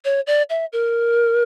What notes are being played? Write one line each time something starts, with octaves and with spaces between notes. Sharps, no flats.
C#5
D5
E5
A#4